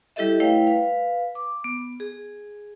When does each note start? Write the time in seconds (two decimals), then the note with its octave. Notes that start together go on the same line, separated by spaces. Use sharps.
0.16 G3 E4 G4 A4 D#5 E5
0.40 A3 E4 B4 C#5 F5 G5
0.67 B4 F5
1.35 D6
1.64 B3
2.00 G#4